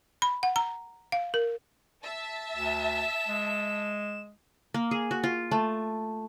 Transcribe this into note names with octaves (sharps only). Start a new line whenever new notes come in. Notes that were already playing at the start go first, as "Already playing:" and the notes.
B5
F#5
A#5
F5
A#4
E5 A5
D2 E7
G#3
A#3
G#4
F#4
F4
A3